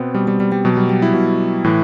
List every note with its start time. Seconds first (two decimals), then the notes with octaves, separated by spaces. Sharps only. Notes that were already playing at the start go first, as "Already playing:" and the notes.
Already playing: B2 B3 C4
0.14 B2 G3
0.28 G3
0.40 G3
0.52 G3
0.65 B2 F#3
0.77 G3
0.90 G3
1.02 E4
1.14 B2
1.64 A2 E3